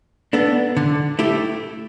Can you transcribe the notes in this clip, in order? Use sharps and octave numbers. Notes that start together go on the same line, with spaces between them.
B3 D4 A4
D3
A3 E4 G4